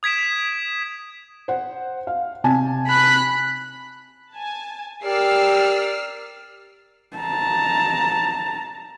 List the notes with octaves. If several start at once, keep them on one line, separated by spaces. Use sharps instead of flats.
D#6 G#6 B6 D7 E7
C5 F#5
F5
C3 G#5 A5
B5 F#6
G#5 A5
G4 A#4 D5 E6 F6 C7
A5 A#5